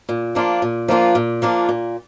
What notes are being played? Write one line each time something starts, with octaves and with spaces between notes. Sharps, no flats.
A#2
F3 A#3 D4 F4
A#2
F3 A#3 D4 F4
A#2
F3 A#3 D4 F4
A#2